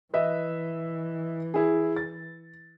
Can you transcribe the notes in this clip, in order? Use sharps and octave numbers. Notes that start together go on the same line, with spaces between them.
E3 B4 D#5 E5
E4 G#4
A6